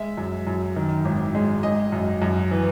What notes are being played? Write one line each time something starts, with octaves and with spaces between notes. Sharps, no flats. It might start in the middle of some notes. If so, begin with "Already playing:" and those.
Already playing: G#3 E5
F#2
F#2
D#3
G#1
G#3
G#3 D#5
F#2
F#2
E3